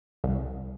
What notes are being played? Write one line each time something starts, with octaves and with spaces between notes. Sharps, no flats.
C2